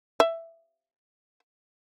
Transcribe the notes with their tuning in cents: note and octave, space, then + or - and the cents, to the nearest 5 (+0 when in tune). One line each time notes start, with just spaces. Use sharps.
E5 +10